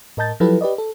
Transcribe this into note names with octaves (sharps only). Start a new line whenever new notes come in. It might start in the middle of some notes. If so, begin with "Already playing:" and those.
A2 A#4 D#5 A5 G6 A6
F3 F#3 E4 G4 A4 B4
G4 B4 D5 D#5
A4